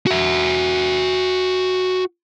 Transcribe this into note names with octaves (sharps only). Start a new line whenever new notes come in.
F#4 E5